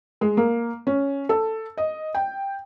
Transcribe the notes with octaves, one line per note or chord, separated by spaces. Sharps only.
G#3
A#3
C#4
A4
D#5
G5